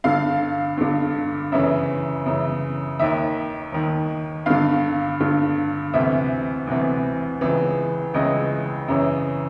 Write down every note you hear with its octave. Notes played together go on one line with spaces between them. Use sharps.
G2 D3 F5
G2 D3
F#2 C#3 E3 E5
F#2 C#3 E3
D#2 D#3 E5
D#2 D#3
G2 D3 F5
G2 D3
D2 C3 E3 E5
D2 C3 E3
C#2 C#3 E3
C#2 C#3 E3 D#5
F#2 C#3 E3